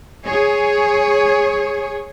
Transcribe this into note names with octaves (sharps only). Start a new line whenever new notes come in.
G#4 C#5